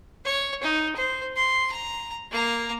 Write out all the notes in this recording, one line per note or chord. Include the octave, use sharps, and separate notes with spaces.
C#5
D#4
C5
C6
A#5
A#3 A#5